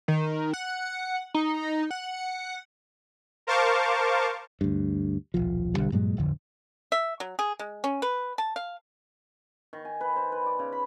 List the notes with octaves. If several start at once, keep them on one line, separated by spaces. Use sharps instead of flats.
D#3
F#5
D#4
F#5
A#4 C5 F5 A5 C#6 D6
D2 G2
D#1 B1 F3
B1 D3 G3
G2 A#2 F#3 G#3
D1 A#1 F2 D3
E5
F#3
G#4
G#3
C#4
B4
A5
F5
D#3
G#5
B4
C5
B4
D5
C#3
B5